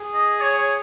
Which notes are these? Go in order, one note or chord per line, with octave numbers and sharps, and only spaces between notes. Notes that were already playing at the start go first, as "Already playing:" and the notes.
Already playing: G#4
D#5
C#5
C#5